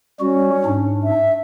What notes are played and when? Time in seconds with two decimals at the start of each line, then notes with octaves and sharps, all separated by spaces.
0.20 G3 C#4 F#4
0.65 G#2 D4
1.03 E5